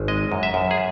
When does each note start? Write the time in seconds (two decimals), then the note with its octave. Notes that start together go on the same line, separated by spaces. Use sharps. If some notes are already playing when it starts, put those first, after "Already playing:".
Already playing: G#1
0.08 G#3 D#5
0.32 F#2
0.43 E5
0.54 F#2
0.71 G#4